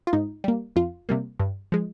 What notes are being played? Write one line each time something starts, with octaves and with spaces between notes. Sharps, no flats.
F4
G#2 D#4
G3 A#3
F2 F4
C3 G3 A#3
G2
F3 G#3